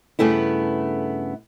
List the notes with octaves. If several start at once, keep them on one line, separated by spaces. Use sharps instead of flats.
G2 A#2 C#3 A3 B3 E4